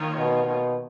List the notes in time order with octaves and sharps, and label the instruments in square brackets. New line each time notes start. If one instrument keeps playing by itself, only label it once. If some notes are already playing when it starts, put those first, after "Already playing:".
Already playing: [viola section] D#3 A#3 F4 A#4 C#5
[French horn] B2
B2